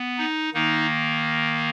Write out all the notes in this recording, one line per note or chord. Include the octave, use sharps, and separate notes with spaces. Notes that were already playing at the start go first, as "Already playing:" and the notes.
Already playing: B3
D#4
D#3 A#3 D#4